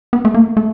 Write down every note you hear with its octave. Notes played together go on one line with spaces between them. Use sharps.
B3
A3
A#3
A3